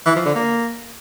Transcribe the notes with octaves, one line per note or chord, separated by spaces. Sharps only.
E3
F3
D3
A#3